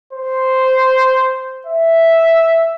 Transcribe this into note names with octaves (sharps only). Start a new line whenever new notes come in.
C5
E5